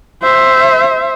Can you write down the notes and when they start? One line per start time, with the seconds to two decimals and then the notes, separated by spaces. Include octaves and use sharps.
0.22 C5 E5